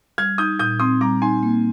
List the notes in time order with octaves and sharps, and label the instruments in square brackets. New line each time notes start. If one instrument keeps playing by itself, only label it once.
[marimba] G3 [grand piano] F6 G#6
[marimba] D#4 [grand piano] D#6 G6
[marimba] A#2 [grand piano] D#6 G6
[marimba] C4 [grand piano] C6 D#6
[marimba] G3 [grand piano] A#5 D6
[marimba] D#4 [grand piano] G#5 C6
[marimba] A#3